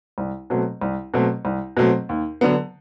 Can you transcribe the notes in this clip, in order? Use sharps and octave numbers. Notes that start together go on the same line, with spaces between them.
C2
B2 F#3 A3 C4
C2
B2 F#3 A3 C4
C2
B2 F#3 A3 C4
D#2
D3 F#3 B3